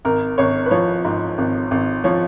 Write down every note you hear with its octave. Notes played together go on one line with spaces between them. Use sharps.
G#1 A#4
G#1 C#5
B4
F3 C#5
G#2
G#1
G#1
F3 C#5